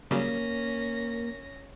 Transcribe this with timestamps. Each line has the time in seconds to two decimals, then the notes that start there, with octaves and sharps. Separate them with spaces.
0.11 C#3 F#3 G3 A#3 C#4 A#6